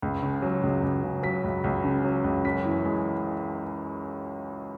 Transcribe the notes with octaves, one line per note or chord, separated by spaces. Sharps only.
C#2
C#3
F#3
C#2
C#2
C#3
F#3 B6
C#2
C#2
C#3
F#3
C#2
F#2 B6
E3
G#3